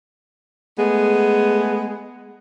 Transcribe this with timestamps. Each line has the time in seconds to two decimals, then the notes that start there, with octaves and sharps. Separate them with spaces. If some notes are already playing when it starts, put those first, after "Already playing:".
0.79 G#3 A3 B3 G#4